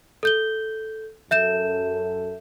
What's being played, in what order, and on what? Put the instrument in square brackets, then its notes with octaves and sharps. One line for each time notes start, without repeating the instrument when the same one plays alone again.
[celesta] A4 G6 G7
[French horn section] F#2 A4 [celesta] E5 G6 E7